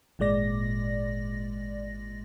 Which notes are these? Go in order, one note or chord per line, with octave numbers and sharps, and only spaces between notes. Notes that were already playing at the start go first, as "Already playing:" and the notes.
G#1 A#2 G#3 D5 A#6